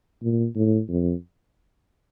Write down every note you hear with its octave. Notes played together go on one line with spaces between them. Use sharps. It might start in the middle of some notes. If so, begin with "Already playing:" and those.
A#2
A2
F2